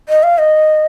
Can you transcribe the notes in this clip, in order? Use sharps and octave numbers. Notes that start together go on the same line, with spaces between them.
D#5
F5
D#5